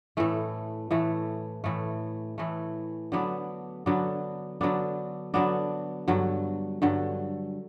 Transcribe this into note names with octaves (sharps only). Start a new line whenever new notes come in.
A2 E3 A3
A2 E3 A3
A2 E3 A3
A2 E3 A3
D3 F#3 B3 D4
D3 F#3 B3 D4
D3 F#3 B3 D4
D3 F#3 B3 D4
G2 D3 F#3
G2 D3 F#3